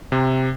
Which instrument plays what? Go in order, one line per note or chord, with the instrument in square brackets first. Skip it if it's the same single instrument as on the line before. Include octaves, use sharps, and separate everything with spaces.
[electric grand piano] C3